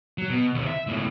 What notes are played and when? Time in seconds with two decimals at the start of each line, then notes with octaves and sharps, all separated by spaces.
0.18 F#3
0.30 B2
0.55 D#2 C3
0.67 E5
0.87 C#2 A2